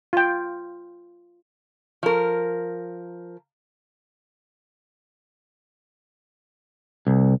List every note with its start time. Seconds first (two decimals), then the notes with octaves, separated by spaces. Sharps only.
0.13 F4 G5
2.03 F3 A#4
7.07 C2